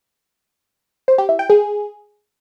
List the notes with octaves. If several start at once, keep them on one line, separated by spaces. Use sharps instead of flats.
C5
G4
E4
G5
G#4